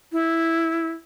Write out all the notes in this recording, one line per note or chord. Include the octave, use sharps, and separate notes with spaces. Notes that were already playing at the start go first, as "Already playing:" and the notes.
E4